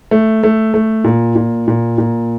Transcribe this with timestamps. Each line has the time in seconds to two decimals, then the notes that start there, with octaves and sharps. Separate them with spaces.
0.11 A3
0.43 A3
0.74 A3
1.04 A#2
1.36 A#2
1.68 A#2
1.98 A#2